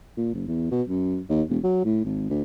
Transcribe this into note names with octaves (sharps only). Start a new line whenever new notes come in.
A#2
F#1
E2
B2
F#2
D#2
E1
F#3
A2
G#1
D2